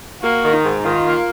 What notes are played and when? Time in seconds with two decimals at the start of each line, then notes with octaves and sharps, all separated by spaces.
0.22 A#3 F#4
0.43 D#3
0.53 D#4
0.64 G#2
0.84 D#3 F4
1.06 A#3